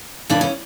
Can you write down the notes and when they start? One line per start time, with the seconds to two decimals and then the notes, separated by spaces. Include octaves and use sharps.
0.30 F#2 C#3 E3 D4
0.41 C#4